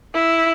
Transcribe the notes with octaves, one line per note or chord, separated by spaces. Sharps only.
E4